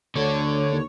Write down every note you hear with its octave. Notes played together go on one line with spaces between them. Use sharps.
D2 D3 A4 C#5
D#2